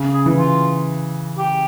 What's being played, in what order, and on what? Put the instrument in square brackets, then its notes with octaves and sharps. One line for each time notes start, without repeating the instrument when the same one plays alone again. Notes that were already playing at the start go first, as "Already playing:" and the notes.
Already playing: [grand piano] C#3
[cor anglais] G#4
[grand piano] E3
[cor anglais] F4
G4